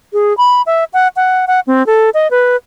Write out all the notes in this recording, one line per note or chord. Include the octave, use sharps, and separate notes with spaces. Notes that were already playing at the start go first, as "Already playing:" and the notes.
G#4
B5
E5
F#5
F#5
F#5
C4
A4
D#5
B4